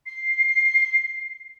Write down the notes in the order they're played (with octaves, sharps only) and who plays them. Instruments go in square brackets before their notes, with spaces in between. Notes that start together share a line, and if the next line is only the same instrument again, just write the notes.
[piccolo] C7